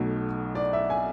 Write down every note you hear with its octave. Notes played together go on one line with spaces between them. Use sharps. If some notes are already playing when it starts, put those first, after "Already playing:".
Already playing: B1 B2 A3
D5
E5
G#5